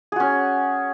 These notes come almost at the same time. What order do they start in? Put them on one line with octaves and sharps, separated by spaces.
G#4 F#4 C#4